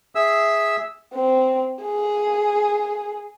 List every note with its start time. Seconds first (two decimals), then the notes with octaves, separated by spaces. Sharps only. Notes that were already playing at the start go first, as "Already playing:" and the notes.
0.15 G#4 E5 E6
1.14 C4
1.84 G#4